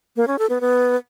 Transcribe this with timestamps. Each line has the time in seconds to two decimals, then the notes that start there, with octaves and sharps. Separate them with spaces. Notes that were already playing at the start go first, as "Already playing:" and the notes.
0.16 A#3
0.27 C#4
0.39 A4
0.50 B3
0.61 B3